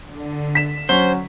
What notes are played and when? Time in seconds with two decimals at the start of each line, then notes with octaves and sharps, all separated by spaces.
0.11 D3
0.55 B6 E7
0.89 F#3 C#4 C5